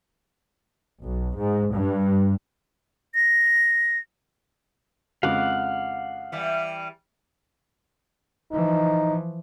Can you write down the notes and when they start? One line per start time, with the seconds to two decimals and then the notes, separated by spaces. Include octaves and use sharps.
1.01 B1
1.37 G#2
1.71 G2
3.15 A#6
5.23 F2 C#3 G#3 F5 F#5 D6
6.32 E3 G3
8.52 E3 F3 D#4